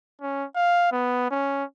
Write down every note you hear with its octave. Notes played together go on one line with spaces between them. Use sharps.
C#4
F5
B3
C#4